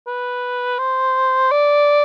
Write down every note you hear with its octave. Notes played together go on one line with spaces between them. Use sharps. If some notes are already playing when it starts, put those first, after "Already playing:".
B4
C5
D5